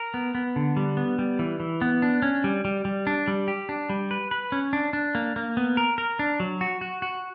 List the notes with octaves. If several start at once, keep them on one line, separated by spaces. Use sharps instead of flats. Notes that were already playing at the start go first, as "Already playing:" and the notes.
Already playing: A#4
B3
B3
D3
G3
B3
G3
E3
E3
B3
D4
C#4
G3
G3
G3
D4
G3
G4
D4
G3
B4
B4
C#4
D4
D4
A#3
A#3
B3
A#4
A#4
D4
F#3
F#4
F#4
F#4